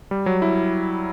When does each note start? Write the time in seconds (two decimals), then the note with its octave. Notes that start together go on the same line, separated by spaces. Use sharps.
0.11 G3
0.26 F#3
0.42 E4